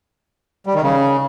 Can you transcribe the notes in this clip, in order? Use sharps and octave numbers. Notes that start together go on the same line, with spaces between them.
G3
D#3
C#3